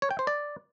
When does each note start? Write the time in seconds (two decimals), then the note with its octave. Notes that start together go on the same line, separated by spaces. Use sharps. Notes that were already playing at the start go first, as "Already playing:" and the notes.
0.02 C#5
0.11 G5
0.19 C5
0.27 D5